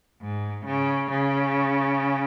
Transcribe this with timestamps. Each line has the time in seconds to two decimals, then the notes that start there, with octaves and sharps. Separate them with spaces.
0.21 G#2
0.65 C#3
1.10 C#3